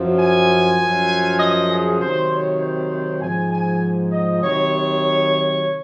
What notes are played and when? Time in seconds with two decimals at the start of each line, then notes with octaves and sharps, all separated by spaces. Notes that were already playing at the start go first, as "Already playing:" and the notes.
Already playing: F#2 F3
0.19 G#5
0.80 F#2 F3
1.40 D#5
1.69 G#4
2.00 C3 D#3 F#3 C5
2.31 C#5
2.60 C5
2.91 C5
3.21 G#2 F3 G#5
3.51 G#5
4.12 D#5
4.43 C3 D#3 F#3 C#5